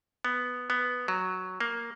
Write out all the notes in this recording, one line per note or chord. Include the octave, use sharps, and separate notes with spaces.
B3
B3
F#3
A#3